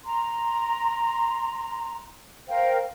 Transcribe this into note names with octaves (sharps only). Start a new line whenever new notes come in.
A#5 C6
A#4 C5 F5 G5